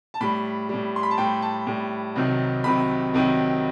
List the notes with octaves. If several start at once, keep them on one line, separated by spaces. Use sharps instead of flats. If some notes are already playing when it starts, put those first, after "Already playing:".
A5
A2 G3 B5
A2 G3
C6
B5
A5
A2 G3 G5
A5
A2 G3
C2 C3 D#3 F#3
C2 C3 D#3 F#3 B5
C2 C3 D#3 F#3